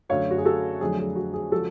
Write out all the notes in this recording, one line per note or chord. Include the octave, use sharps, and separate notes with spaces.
F#2 D3 F#3 A3 C#5 F5
F#4
G#4
F#4 A4
F2 D3 F#3 A3 G#4
G#4
F#4
G#4
C#3 F3 G#3 F#4 A4